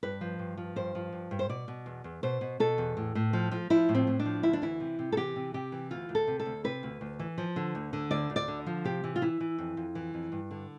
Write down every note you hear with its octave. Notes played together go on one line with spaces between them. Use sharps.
G2 B4
F3
G2
F3
G2 C5
F3
G2
G2
C5
B2 D5
B2
E2
E2
B2 C5
B2
B2 A4
E2
A2
A2
F3
F3
F3 E4
A2
C4
A2
D4
F3
D2 E4
D4
E3 E4
C3
C3
A4
E3 G4
C3
C3 G4
E3
D2 F4
D2
A4
C3
A4
D2
C3 B4
D2
D2
E3
F3
D3
D2
D3
D2 D5
D2
D5
D3
F3
C3 G4
E3
F4
E3 E4
E3
F2
F2
E3
F2
G2
D3